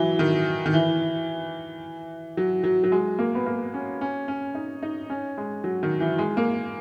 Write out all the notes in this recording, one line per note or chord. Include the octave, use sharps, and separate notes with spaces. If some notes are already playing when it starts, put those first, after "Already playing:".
Already playing: E3 F#3
D#3
D#3
E3
F#3
F#3
F#3
G#3
A#3
B3
A#3
C#4
C#4
C#4
D#4
D#4
C#4
G#3
F#3
D#3
E3
G#3
A#3